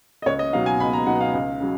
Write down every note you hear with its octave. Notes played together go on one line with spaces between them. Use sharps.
D#5
C#2 C#5
D#5
B2 F#3 B3 D#4 F5
G#5
C#2 B5
A#5
B2 F#3 B3 D#4 F#5
F5
C#2
C#3 F#3